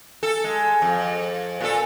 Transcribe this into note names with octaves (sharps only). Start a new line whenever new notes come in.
A4
G#3
F2
A#2 A4